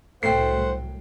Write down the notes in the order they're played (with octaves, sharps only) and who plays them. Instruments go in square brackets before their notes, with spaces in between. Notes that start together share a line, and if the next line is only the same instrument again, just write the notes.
[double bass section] C2 A2 F#3 [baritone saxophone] A3 [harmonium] C5 F#5 [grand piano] G5 C7